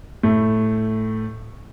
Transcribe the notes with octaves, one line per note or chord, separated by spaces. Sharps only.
A2 A3